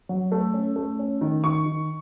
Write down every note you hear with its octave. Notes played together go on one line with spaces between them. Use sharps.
F#3
A3
C#4
A3
C#4
D#3
D#3 C#6
D#3